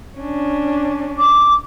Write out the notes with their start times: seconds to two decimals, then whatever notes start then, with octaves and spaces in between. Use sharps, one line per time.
0.18 C#4 D4
1.18 D6